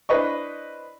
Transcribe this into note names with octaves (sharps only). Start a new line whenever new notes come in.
D4 E4 B4 C5 D#5 C#6